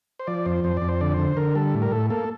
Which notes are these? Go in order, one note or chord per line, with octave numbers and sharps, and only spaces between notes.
C5
F3 D5
F2 C5
F2 C5
F2 D5
C5
D3 D5
D3 C5
D3 A#4
G3 A4
A2
A#4
A2 A4
A#3 A4